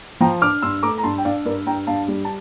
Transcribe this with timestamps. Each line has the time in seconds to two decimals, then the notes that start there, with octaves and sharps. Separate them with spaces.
0.20 F3 G5 A#5
0.42 D4 D6 F6
0.62 G2 C6 E6
0.83 A3 A#5 D6
0.98 A#5
1.03 G2 A5 C6
1.18 G5
1.25 D4 D5 F5
1.45 G2 A#4 D5
1.66 G2 G5 A#5
1.87 G2 F5 A5
2.08 G3
2.25 A5